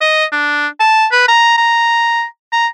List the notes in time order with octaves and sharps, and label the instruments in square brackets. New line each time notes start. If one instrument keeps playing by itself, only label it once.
[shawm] D#5
D4
A5
B4
A#5
A#5
A#5